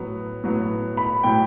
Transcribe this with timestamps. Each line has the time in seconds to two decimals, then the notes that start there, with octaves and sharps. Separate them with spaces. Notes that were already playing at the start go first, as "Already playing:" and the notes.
Already playing: A2 F#3 B3
0.44 A2 F#3 B3
0.97 B5
1.23 A2 F#3 B3 G5